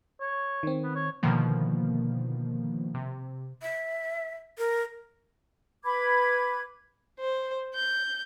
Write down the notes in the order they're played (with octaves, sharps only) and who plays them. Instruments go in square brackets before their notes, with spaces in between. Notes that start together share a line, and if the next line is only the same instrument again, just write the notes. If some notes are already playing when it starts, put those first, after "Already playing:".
[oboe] C#5
[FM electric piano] D#3 C4
[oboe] B3
C#5
[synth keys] B2 D3 D#3 F3 A#3
C3
[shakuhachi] E5
A#4
[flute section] B4 B5 D6 G#6
[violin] C5
G6